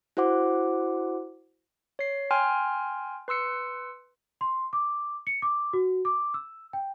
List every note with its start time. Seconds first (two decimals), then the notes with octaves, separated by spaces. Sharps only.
0.17 E4 F#4 C5 F#5 D6
1.99 C#5 C7
2.31 G5 G#5 C6 F6
3.28 B4 C6 E6 C#7
4.41 C6
4.73 D6
5.27 C#7
5.42 D6
5.73 F#4
6.05 D6
6.34 E6
6.73 G5